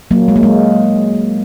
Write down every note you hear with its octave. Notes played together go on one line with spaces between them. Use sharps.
F#3 A#3
G#3
A#3
G#3